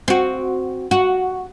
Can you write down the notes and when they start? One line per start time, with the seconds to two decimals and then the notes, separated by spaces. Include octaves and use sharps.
0.08 C4 F#4
0.91 F#4